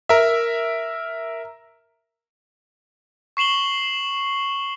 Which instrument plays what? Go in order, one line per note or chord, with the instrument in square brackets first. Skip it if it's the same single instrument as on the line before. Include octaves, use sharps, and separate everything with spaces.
[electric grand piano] A#4 E5
[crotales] C#6 C7 E7 F#7 G7